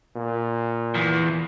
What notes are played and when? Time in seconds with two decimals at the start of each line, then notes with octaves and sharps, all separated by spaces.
0.16 A#2
0.95 E2